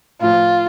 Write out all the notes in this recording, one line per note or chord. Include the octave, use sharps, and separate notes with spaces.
A2 F3 F4